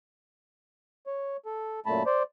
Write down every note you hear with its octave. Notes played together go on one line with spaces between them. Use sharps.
C#5
A4
F#2 A#2 A3 A5 B5
C5 D5